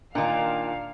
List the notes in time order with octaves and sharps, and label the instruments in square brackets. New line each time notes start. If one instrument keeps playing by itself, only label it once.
[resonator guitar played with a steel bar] A#2 D#3 [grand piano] D4 [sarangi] F5